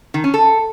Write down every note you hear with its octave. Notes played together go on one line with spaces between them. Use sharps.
D#3
C#4
A4